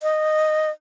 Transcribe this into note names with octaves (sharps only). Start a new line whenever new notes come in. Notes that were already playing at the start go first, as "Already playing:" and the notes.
D#5